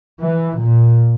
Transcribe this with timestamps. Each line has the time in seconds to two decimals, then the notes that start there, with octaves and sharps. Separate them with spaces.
0.21 E3
0.60 A#2